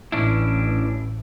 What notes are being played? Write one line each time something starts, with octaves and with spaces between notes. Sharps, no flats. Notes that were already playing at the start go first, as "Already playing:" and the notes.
A1 C#4 D4 E4